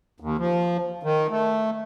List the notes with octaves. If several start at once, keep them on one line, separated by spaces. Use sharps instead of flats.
D#2
F3
D#3
A3